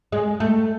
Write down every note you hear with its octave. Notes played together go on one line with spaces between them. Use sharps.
G#3
A3